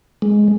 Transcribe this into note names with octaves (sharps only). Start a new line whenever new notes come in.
G#3